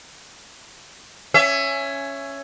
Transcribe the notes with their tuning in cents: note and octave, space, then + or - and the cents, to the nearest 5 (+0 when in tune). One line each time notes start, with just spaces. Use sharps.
C#4 +0 E5 +20